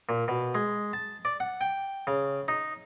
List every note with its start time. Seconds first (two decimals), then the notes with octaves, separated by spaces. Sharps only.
0.09 A#2
0.28 B2
0.55 G#3
0.93 A5
1.25 D5
1.40 F#5
1.61 G5
2.07 C#3
2.48 D#4